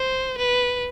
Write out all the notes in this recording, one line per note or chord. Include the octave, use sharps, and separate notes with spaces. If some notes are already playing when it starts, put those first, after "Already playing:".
Already playing: C5
B4